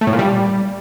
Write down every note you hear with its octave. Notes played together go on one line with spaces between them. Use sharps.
A3
A2
A#2
G3